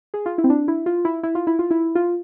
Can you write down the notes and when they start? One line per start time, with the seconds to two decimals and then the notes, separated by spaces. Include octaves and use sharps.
0.14 G#4
0.26 F4
0.38 E4
0.44 C4
0.50 D4
0.68 E4
0.86 F4
1.05 E4
1.23 E4
1.35 F4
1.47 E4
1.59 F4
1.71 E4
1.95 F4